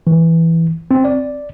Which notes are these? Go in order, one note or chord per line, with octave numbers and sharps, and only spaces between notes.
E3
C4
D5